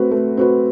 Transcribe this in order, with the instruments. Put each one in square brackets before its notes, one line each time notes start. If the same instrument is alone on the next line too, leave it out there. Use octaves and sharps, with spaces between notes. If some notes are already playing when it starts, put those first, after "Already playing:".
Already playing: [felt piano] A3 C4 F#4 B4
A3
C4 F#4 B4